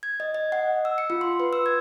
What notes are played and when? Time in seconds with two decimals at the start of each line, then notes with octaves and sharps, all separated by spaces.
0.03 G#6
0.20 D#5
0.34 D#5
0.52 F#5
0.85 E6
0.98 C#7
1.10 F4
1.21 C6
1.40 B4
1.53 E6
1.66 G#6